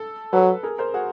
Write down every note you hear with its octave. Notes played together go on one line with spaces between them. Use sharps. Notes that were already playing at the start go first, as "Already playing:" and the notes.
Already playing: A4
F#3 A4 B4
G#4 A#4
A#4 C5
F#4 G#4